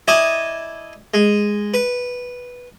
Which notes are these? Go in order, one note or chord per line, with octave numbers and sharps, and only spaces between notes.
E4 D5 D#5 G#5 A5 D6
G#3
B4